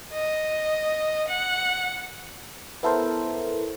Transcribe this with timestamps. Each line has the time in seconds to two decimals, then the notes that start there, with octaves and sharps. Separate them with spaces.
0.13 D#5
1.28 F#5
2.83 B3 E4 A4 A#4 C5